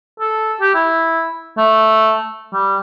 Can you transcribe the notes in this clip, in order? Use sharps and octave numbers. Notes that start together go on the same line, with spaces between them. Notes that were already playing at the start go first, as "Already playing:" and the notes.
A4
G4
E4
A3
G3